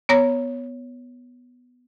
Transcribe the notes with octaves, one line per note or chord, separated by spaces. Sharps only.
B3 C#5 A#5 A#6